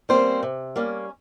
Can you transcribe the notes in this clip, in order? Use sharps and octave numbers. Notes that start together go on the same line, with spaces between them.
G3 A#3 C4 C#4 C5
C3
G3 A#3 C#4